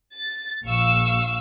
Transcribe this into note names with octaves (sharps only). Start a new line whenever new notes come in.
A6
A#1 F5 C#6 E6